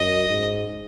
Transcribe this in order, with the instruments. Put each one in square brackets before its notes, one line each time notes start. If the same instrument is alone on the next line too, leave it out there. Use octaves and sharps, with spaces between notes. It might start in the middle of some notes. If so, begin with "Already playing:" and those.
Already playing: [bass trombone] F#2 [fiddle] D#5
[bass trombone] G#2